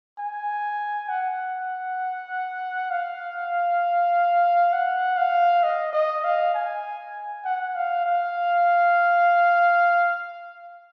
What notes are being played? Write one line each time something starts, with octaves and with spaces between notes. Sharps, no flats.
G#5
F#5
F5
F#5
F5
D#5
D#5
F5
G#5
F#5
F5
F5